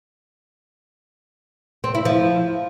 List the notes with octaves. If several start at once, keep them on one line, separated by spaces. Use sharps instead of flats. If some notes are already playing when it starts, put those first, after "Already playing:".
C4
E4
F3